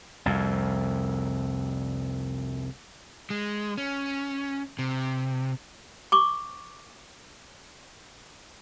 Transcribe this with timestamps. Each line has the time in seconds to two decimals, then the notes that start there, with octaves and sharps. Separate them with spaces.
0.26 C2 F2
3.30 G#3
3.78 C#4
4.79 C3
6.12 C#6 D6